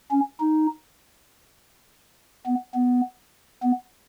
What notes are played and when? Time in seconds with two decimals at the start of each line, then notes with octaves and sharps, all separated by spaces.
0.11 C#4
0.40 D#4
2.46 B3
2.75 B3
3.63 B3